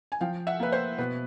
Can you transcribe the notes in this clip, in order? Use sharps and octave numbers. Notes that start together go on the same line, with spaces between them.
G#5
F3 F5 G5
E5 F#5
A#3 B4
C5
B2 B4